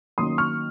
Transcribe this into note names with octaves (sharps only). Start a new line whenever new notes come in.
D#3 F#3 A#3 C#4 C6 D#6
C#6 F6